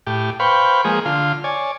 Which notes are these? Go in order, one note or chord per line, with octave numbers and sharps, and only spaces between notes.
A2 G4
B4 C5 F5 G5 B5 C#6
F3 G#3 A#3 G#4
D3 F4 F5
C#5 D5 G#5